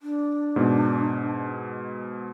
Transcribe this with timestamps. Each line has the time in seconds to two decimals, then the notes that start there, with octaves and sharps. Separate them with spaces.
0.02 D4
0.56 G#2 B2